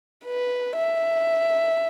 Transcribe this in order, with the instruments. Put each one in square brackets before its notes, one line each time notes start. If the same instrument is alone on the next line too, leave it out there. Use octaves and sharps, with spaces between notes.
[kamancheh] B4
E5